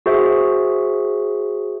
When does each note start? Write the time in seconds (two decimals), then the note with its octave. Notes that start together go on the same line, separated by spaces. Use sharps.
0.06 F#4 G#4 C5 E5